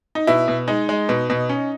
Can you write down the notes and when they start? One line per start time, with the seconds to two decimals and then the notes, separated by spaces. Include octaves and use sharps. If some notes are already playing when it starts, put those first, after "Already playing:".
0.15 D#4
0.27 B2 E4
0.48 B2
0.68 G#3 D#4
0.89 G#3
1.09 B2
1.30 B2
1.49 C#4